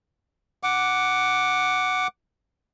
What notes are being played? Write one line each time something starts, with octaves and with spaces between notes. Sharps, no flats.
F#5 D6